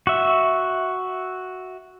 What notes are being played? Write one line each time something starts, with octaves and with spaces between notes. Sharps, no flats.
F#4 E5